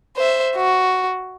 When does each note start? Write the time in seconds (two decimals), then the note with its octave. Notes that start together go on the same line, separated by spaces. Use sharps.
0.17 C5 E5
0.56 F#4